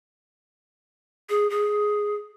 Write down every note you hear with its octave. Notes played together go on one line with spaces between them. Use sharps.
G#4
G#4